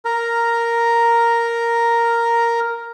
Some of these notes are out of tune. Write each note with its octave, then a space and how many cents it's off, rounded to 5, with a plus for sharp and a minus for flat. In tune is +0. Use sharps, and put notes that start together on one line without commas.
A#4 +0 A#5 +0